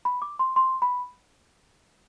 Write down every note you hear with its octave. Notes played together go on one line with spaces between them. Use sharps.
B5
D6
C6
C6
B5